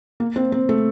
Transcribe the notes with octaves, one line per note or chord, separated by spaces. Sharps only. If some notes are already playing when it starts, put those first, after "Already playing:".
A#3
C4
C4
A3